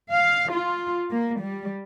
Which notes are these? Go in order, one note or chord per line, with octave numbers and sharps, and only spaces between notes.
F5
F4
A#3
G3